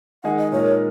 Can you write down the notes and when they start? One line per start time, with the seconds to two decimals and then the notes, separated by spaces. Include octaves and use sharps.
0.24 D#3 G#3 D#4 G#4 F#5
0.38 D#5
0.52 A#2 G#3 D#4 A#4 C#5